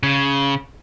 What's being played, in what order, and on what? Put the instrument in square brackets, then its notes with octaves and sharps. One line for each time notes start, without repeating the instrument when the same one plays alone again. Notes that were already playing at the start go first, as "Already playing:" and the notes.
[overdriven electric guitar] C#3